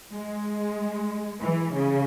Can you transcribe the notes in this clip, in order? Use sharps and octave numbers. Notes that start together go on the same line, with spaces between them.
G#3
E3
C#3